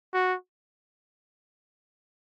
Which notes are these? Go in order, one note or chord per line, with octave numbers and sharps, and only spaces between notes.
F#4